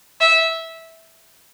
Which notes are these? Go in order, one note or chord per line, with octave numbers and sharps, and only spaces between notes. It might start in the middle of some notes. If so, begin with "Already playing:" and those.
E5